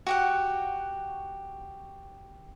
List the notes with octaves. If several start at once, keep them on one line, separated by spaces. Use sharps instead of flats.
F#4 G4 F#5